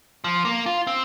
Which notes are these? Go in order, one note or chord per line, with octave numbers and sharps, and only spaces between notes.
F3
A#3
F4
C4